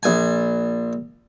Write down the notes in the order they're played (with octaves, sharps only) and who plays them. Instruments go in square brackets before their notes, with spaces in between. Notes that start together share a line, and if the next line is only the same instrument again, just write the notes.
[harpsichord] A#1 G#5